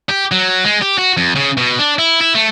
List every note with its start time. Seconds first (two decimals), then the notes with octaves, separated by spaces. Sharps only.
0.09 G4
0.32 F#3
0.65 G#3
0.82 G4
0.98 F#4
1.17 F2
1.35 C#3
1.57 B2
1.79 D4
1.99 E4
2.21 E4
2.35 A3